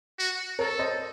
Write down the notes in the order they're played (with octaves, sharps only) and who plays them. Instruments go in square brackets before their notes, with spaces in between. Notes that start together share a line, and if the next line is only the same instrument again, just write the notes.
[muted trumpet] F#4
[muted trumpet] A4 [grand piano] A#4 C#5
[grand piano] C5 D#5